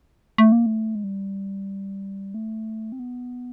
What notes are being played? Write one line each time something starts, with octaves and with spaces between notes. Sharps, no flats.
A3
A#3
A3
G#3
G3
A3
C4
B3